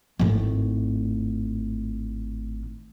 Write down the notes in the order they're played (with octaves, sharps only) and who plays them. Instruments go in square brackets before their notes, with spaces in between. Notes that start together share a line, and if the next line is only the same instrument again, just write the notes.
[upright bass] G#1 A2